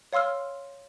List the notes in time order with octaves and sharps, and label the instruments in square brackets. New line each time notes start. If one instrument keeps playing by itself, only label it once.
[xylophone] C#5 F5 C6 E6 F6